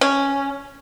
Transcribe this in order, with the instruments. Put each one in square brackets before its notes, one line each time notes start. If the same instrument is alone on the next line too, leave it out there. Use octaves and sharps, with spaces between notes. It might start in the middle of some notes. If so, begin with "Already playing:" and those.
[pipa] C#4